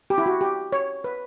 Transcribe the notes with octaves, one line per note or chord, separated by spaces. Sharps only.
G4
E4
F#4
G4
C#5
B4